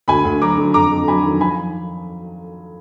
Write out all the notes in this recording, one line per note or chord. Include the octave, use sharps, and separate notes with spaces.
D2 G#5 B5
D2
F#3 A#5 D6
D3
F2 A#5 D6
F2
F#3 G#5 B5
D#3
F3 G#5 B5